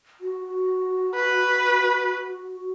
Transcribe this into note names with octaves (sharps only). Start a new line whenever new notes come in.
F#4
B4